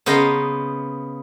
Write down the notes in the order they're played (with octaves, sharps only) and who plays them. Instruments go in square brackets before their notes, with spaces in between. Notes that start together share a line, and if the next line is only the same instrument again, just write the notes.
[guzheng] C#3 B3 C5 D#5 F5 A#5